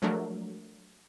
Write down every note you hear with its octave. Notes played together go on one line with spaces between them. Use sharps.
F3 F#3 G#3 A3 D4 A#4